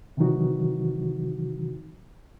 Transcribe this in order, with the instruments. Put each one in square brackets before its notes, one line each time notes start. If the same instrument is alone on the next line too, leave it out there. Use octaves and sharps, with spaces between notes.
[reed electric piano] C3 D#3 E3 F#3 D#4 F#4